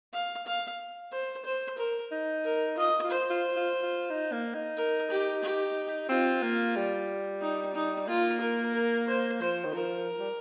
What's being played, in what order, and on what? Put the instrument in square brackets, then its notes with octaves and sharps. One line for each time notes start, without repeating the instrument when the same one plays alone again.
[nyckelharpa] F5
F5
C5
C5
A#4
[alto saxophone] D#4
[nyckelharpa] A#4
[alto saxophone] F4 [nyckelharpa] D#5
[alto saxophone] F4
[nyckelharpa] C5
[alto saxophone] F4
F4
F4
D#4
A#3
D#4
[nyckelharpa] A#4
G4
G4
[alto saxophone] C4 [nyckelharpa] F4
[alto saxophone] A#3
G3
[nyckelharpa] D#4
D#4
[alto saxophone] A#3 [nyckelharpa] F4
[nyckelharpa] A#4
A#4
C5
[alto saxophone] F3 [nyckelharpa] C5
[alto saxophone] D#3
[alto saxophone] F3 [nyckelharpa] A#4
[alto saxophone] G3